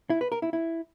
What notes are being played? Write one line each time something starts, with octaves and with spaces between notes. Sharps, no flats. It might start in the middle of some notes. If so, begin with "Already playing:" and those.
E4
B4
A#4
E4
E4